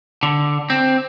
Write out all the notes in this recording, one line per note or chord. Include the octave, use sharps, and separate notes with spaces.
D3
C4